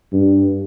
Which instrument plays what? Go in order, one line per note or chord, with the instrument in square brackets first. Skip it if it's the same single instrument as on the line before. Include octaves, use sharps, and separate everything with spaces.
[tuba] G2